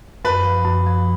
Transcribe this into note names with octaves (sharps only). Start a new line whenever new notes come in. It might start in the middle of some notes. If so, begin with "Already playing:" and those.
F#2 B4
F3
F#2
F3